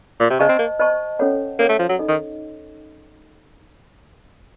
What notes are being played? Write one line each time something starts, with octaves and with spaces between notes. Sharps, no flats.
A#2
C3
C#3 C5 D#5 A5 C#6
C4
A#3
C5 D#5 A5 C#6
C#4 A4 C#5 F#5
A#3 C#4 A4 C#5 F#5
A3
F3
F#3
D#4 A4 D#5
D#3